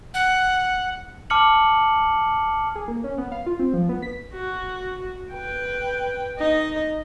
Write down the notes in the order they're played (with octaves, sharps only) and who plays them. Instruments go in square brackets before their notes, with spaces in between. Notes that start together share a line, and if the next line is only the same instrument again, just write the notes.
[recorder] F#5
[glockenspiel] A5 D6 F6 C#7 F#7
[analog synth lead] G#4
A#3
C#4
B3
F5
F4
C4
F3
B3
B6
[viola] F#4
B4 G5
D#4 D#5